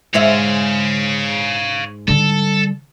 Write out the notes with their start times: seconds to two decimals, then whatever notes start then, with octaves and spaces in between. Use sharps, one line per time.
0.14 G#2 G#3 C#5 E5 F5
2.08 D3 G3 A4